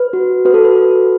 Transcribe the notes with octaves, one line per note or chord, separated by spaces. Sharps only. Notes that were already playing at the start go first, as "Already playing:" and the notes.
Already playing: B4
F#4
F#4 B4
A4
B4
A4